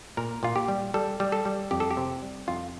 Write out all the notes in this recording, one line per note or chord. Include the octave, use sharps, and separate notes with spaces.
A#2 A#4
A#2 F4
G4
G3
G3 A4
G3
A4
G3
F2 G4
A4
G4
C3
G3
F2 F4